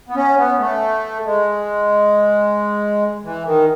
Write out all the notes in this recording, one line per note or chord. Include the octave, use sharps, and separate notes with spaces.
B3
C#4
B3
A3
G#3
E3
D#3